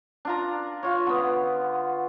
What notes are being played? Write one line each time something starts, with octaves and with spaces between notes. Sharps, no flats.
D4 F4 A#5
F4 C#5
D3 B3